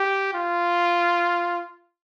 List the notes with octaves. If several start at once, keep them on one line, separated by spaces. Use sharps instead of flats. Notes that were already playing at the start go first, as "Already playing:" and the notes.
Already playing: G4
F4